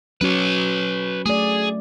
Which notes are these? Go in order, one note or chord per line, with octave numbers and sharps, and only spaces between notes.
F#3 C#4 F#4 B4 C#5
A3 G#4 D5